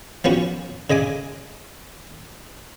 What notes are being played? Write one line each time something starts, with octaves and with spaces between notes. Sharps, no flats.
F3 B3 C#4 F#4
C#3 D#5 G#5 D6